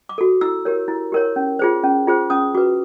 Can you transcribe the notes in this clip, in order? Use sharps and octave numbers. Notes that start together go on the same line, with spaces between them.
D6
F#4 A4
E4 E6
G4 A#4 C#5
E4
G4 A#4 C#5
C#4
F4 G#4 C5
C#4
F4 G#4 C5
C#4 D#6
F#4 B4 D6